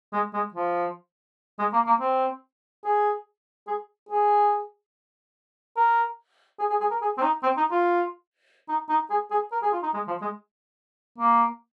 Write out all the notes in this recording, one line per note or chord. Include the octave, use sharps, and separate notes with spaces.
G#3
G#3
F3
G#3
A#3
A#3
C4
G#4
G#4
G#4
A#4
G#4
G#4
G#4
A#4
G#4
C4
D#4
C4
D#4
F4
D#4
D#4
G#4
G#4
A#4
G#4
F4
D#4
G#3
F3
G#3
A#3